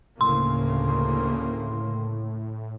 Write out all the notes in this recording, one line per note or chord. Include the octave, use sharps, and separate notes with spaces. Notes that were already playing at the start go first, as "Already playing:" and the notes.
D2 A2 C#3 A#3 C6